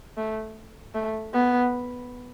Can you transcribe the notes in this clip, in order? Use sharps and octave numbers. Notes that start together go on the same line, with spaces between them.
A3
A3
B3